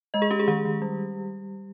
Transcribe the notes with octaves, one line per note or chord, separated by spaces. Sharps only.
G#3 D#5
G#4
C#4 G4
G#4
D#3 G4
D#3
G3